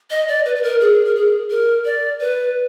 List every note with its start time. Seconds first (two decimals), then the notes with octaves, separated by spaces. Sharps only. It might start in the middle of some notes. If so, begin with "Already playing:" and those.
0.11 D#5
0.28 D5
0.45 B4
0.56 B4
0.63 A#4
0.81 G#4
1.05 A#4
1.15 G#4
1.50 A#4
1.85 D5
2.21 B4